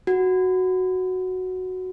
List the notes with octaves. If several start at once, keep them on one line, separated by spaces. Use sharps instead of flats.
F#4